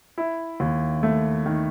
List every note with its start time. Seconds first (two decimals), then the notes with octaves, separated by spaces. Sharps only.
0.18 E4
0.60 D#2
1.03 A3
1.46 D#3